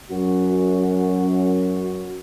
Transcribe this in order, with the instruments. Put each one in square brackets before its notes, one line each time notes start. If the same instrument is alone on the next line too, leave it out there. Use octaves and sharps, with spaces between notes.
[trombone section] F#2 F#4